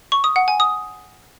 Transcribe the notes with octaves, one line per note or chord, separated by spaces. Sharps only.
C#6
D#6
F#5
G#5
D#6